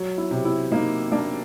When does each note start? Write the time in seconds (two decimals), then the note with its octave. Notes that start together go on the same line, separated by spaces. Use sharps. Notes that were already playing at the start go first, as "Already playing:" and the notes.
Already playing: F#3
0.18 E4
0.31 C3
0.45 E4
0.72 A#3 D#4
1.12 A#3 D4